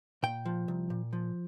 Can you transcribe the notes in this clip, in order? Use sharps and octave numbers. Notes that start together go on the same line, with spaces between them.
A#2 G5
F3
C2
A#2
F3